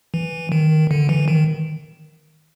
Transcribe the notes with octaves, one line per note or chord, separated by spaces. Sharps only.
E3
D#3
D3
E3
D#3